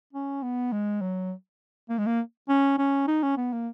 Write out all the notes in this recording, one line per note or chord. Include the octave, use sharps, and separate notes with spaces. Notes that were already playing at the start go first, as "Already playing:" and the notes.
C#4
B3
G#3
F#3
A#3
G#3
A#3
C#4
C#4
D#4
C#4
B3
A#3